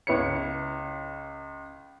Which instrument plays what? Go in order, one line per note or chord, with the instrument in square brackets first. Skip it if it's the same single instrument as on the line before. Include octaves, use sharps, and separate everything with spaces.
[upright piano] C#2 E4 B4 C#5 C#7